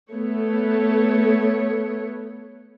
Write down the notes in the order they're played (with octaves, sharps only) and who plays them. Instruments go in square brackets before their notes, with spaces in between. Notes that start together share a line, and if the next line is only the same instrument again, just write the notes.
[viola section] A3 B3 C#5